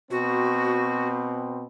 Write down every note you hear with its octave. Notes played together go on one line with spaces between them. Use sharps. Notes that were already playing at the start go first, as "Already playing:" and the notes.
B2 C4 F#4